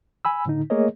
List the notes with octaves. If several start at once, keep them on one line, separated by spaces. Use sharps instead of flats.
G#5 B5 E6
A2 D3 D#4
A3 A#3 G#4 A#4 C#5 D#5